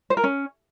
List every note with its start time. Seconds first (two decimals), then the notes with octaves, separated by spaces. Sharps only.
0.10 C5
0.17 A#4
0.24 C#4